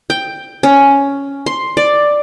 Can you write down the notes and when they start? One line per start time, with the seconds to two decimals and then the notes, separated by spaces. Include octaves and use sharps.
0.10 G5
0.63 C#4
1.46 C6
1.77 D5